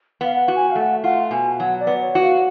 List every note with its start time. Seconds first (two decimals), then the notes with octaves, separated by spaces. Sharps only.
0.21 B3 F5
0.34 F#5
0.48 F#4
0.56 G#5
0.70 F5
0.75 A3 F#5
1.04 F4 F#5
1.31 B2 G#5
1.59 F#3 F#5
1.80 D5
1.87 B3
2.01 C#5
2.15 F#4
2.22 F5